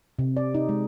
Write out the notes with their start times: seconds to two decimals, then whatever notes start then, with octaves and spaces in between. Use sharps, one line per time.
0.19 C3
0.37 D5
0.55 D#4
0.69 G#3